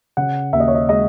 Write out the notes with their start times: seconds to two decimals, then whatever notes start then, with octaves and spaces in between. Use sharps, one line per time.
0.17 C#3 F#5
0.53 D#2 E5
0.60 D#5
0.68 C#5
0.74 D#5
0.89 G#3 D#5